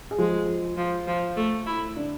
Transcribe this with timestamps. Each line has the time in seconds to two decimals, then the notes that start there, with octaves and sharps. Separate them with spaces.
0.11 G#4
0.18 F3 G#3 F4
0.77 F3
1.07 F3
1.37 A3
1.66 E4
1.96 D3 D4